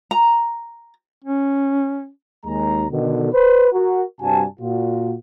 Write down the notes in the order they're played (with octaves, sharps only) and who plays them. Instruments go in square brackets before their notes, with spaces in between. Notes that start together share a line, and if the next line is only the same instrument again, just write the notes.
[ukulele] A#5
[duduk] C#4
[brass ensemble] D#2 G#3 A#5
B2 D3 D#3
B4 C5
F#4 A#4
G2 C3 G3 F#4 G#5 A5
A#2 F4 F#4